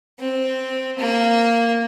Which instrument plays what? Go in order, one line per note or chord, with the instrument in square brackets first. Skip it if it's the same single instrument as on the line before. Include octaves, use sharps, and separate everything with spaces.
[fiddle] C4
A#3